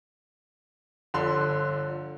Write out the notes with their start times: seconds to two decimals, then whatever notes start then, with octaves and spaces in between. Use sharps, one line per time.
1.14 G1 D3 F3 C6 F#6